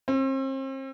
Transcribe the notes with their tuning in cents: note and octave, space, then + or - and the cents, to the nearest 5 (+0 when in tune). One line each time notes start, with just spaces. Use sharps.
C4 +40